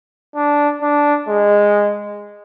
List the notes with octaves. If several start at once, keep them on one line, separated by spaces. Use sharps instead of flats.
D4
D4
G#3